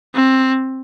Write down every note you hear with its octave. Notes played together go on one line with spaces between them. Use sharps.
C4